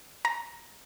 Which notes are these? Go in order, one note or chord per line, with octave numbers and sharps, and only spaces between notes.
A#5